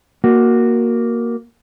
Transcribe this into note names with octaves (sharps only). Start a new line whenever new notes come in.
A#3 F#4